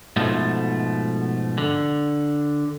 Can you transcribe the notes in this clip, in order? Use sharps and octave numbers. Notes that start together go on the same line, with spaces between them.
G#2 B2 F3 A3
D3